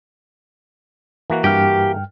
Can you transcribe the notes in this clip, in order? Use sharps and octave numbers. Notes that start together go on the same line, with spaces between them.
E3 A#3 F#4
G2 G4 G5 F6